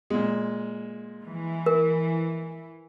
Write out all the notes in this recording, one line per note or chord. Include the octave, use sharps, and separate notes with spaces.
A#2 G#3
E3
A#4